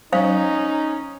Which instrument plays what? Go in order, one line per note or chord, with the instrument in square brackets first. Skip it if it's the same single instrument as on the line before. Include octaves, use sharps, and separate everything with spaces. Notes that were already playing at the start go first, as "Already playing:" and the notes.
[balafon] F#3 [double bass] C#4 [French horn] D#4 [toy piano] C5 F5